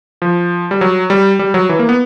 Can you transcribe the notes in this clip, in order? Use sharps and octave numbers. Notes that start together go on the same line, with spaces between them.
F3
G3
F#3
G3
G3
F#3
E3
A#3
B3